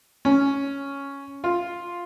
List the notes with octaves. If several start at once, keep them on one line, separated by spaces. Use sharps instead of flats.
C#4
F4